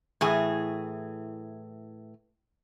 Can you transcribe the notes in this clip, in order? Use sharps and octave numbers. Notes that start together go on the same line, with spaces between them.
A2 E3 G#4